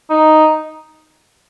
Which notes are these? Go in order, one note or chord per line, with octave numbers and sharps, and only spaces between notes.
D#4